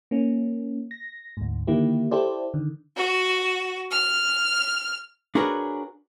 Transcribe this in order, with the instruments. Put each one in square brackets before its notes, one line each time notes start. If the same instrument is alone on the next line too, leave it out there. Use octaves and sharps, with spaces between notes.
[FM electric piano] A#3 C#4
A#6
D2 G#2
D3 D#3 A#3 E4 G4
E4 G4 A4 C5 D5
D3 D#3
[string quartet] F#4
F6
[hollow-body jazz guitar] D4 F#4 G#4 A#4 B4 C#5